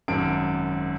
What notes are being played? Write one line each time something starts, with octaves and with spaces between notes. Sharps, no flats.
G#1 F#2 D7